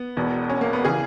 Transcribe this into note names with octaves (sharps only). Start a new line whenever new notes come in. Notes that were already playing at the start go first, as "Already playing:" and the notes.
Already playing: B3
E1 E2 B2
C#4
A#3
B3
C#3 E3 G#4